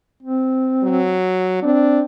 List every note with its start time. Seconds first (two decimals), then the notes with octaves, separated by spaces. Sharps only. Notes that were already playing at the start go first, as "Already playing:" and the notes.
0.23 C4
0.83 F#3
1.62 C4 D4